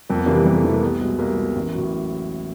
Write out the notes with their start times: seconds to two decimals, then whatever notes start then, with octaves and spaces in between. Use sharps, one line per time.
0.10 F2 A#3
0.18 B3
0.26 C3 E3 G3 A#3
0.45 F2 A#3
0.56 A3
0.64 C3 E3 G3
0.73 A#3
0.82 C2 B3
1.01 B2 G#3
1.19 C2 A#3
1.37 B2 G#3
1.56 A1
1.74 A2 F#3